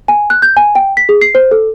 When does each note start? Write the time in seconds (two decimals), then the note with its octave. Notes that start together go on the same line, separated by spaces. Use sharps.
0.08 G#5
0.30 F#6
0.42 G6
0.57 G#5
0.75 G5
0.97 B6
1.09 G#4
1.21 C7
1.35 C5
1.51 A4